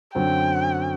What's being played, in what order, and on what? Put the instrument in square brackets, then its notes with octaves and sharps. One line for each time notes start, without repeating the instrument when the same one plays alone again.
[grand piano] F#2 D3 F#3 C4 [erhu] G5